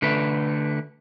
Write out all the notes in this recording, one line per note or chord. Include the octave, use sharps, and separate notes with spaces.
D3 A3 B4